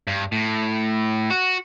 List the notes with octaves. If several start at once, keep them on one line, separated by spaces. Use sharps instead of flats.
G2
A2
F#4